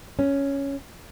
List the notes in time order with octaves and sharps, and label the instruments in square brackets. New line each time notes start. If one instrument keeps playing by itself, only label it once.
[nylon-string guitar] C#4